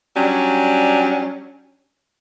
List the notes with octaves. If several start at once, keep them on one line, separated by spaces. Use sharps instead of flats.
F#3 G3 C#4 D4